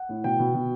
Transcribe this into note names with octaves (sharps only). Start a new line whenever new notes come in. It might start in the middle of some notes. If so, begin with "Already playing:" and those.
Already playing: F#5
A2
B2 G5
B2
B2